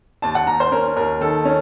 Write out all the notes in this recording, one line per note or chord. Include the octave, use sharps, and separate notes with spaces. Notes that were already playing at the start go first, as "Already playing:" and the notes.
D#2 A5
F#5
D#2 A#5
C5
C#4 A#4
D#2 A#4
D#3 A4
C#4